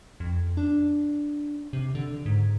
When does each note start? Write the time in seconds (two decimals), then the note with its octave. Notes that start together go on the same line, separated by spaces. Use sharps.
0.20 F2
0.57 D4
1.73 C3
1.95 D3
2.26 G#2